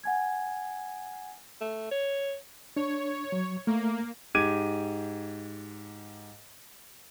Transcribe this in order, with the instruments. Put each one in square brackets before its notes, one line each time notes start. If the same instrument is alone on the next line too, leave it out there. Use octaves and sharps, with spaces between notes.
[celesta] F#5 G#5 G#6
[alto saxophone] A3
C#5
[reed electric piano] D4 [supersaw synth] C#5
[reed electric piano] F#3
[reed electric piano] A3 [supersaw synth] A#3
[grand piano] G#2 G4 D6 G#6 D#7